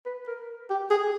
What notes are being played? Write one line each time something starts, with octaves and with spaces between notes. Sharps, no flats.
B4
A#4
G4
G#4